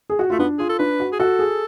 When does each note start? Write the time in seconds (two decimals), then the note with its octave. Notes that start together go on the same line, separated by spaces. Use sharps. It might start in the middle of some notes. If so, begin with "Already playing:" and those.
0.10 G#4
0.19 F#4
0.30 A3 F4
0.39 B3 D4
0.59 F4 G#4
0.69 A4
0.79 D4 B4
1.00 F#4
1.13 G#4
1.20 F#4 A4
1.39 G#4